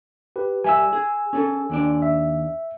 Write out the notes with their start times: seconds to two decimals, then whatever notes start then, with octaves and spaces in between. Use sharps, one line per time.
0.36 G4 B4
0.64 G3 E5 G#5 E6
0.93 G#4
1.33 C#4 G#4 A4
1.70 D#2 D4 D5
2.02 E5